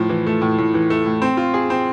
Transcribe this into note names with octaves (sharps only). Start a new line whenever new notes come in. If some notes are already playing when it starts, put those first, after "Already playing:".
Already playing: A2 F3
E3
A3
A2
A2
E3
A3
A2
C4
F4
G#4
C4